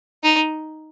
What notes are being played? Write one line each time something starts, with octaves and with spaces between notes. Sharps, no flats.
D#4